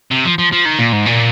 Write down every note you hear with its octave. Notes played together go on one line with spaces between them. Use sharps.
C3
F3
F3
F3
D#3
A#2
G#2
A#2